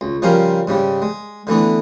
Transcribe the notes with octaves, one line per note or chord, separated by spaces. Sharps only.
C#2
C#3 F3 G3 C#4 A#4 C5
G#2 C#3 G3
G#3
D3 E3 A3 B3